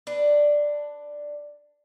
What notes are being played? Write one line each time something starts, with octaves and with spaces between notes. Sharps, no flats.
D4 B4